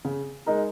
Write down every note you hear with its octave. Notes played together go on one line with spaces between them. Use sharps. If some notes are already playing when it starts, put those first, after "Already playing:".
C#3
G#3 D#4 A#4